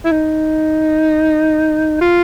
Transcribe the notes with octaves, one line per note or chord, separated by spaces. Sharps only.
E4
D#4
F4